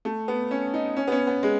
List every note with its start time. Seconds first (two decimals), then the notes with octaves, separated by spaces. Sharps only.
0.05 A3
0.28 B3
0.51 C#4
0.74 D#4
0.97 C#4
1.08 B3
1.12 C#4
1.27 B3
1.43 G#3